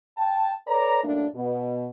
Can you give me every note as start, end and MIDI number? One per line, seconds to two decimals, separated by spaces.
0.18 0.52 79
0.18 0.52 81
0.68 1.02 69
0.68 1.02 71
0.68 1.02 73
0.68 1.02 74
0.68 1.02 82
1.04 1.26 42
1.04 1.26 45
1.04 1.26 57
1.04 1.26 58
1.04 1.26 62
1.35 1.88 47